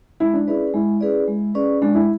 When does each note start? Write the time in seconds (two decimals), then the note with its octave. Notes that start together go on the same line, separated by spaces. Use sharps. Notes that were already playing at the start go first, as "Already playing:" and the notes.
0.20 G#3 E4
0.34 D4
0.47 C#4 E4 G#4 B4 D5
0.74 G#3 E4
1.01 C#4 G#4 B4 D5
1.28 G#3
1.54 C#4 G#4 B4 D5
1.82 G#3 D4
1.95 E4